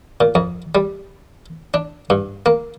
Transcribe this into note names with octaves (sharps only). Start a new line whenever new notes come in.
A#2
F2
G3
D4
G2
A#3